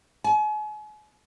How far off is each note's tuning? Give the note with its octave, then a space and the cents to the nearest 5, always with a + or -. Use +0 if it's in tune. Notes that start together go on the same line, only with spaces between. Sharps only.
G#5 +40